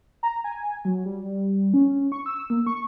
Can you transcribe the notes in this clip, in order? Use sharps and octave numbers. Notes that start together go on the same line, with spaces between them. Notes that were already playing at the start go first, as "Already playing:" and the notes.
A#5
G#5
F#3
G3
C#4
C#6
E6
A#3
C#6